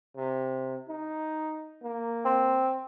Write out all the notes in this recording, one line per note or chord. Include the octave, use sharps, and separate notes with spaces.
C3
D#4
A#3
C4